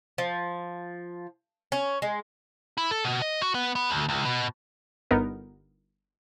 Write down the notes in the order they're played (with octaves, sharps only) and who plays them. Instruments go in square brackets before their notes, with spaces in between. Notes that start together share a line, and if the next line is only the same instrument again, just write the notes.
[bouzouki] F3
C#4
G#3
[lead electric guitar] E4
A4
B2
D#5
F#4
B3
B3
D2
C#2
B2
[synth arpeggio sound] G1 B3 D#4 A#4